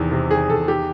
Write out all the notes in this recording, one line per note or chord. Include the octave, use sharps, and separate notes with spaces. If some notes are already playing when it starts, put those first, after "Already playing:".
Already playing: E2 C3 D#3
C3
D#3 G#4
E2 A4
D#3 G4